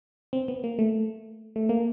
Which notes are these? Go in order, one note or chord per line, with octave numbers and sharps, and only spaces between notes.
C4
B3
A#3
A3
A3
A#3